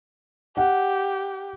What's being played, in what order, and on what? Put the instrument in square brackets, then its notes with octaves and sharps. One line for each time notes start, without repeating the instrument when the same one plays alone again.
[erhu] G4 [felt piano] F#5